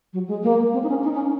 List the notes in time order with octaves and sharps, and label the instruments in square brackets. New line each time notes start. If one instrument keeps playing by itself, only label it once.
[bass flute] F#3
G#3
A#3
C4
D#4
C#4
D#4
C#4